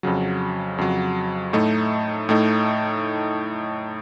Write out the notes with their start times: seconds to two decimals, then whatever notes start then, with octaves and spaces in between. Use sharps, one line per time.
0.03 F2 C#3 F#3
0.78 F2 C#3 F#3
1.53 A2 A3 D#4
2.29 A2 A3 D#4